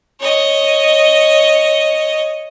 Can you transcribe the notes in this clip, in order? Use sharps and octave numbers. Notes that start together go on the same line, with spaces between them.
C#5 D#5